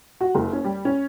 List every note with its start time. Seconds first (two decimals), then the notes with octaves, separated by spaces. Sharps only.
0.21 F#4
0.35 F#1
0.53 C#4
0.64 G3
0.85 C#4